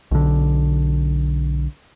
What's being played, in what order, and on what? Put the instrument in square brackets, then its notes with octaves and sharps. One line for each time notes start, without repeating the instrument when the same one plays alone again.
[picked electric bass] B1 D3